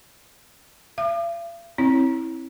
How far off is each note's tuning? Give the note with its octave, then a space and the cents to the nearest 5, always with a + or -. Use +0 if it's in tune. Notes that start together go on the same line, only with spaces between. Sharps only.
F5 -45 D6 +40
C4 +25 E4 -15 C#5 +0